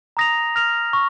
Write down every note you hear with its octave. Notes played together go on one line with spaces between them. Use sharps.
A#5 D#6 A#6 F7
F6 A#6 F7
C#6